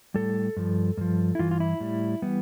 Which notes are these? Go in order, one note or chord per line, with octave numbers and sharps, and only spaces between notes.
A2 G3 A4
G2 F3
G2 F3
E4
G2 E3 F4
F4
E4
A2 G3
E3 G3 B3